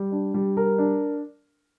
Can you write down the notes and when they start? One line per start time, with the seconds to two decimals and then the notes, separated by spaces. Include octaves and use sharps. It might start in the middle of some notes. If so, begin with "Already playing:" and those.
Already playing: G3
0.12 D4
0.34 G3
0.57 A#4
0.78 D4